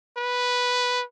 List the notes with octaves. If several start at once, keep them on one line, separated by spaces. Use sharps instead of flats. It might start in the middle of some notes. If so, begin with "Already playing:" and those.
B4